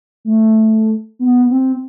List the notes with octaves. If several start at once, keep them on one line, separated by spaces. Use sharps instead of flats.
A3
B3
C4